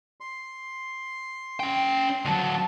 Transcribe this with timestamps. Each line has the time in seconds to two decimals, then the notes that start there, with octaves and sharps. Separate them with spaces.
0.20 C6
1.60 C#4 G5
2.25 D2 F#3 A5